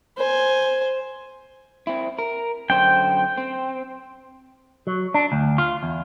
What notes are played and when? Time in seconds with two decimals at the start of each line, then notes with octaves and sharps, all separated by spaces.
0.18 C5 G#5
1.87 C4 E4
2.19 A#4
2.70 F#2 D3 C5 G5
3.37 C4
4.87 F#3
5.14 D4
5.32 D2
5.58 F4
5.83 E2